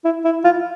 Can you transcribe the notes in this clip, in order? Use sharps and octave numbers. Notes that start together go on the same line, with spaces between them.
E4
E4
F4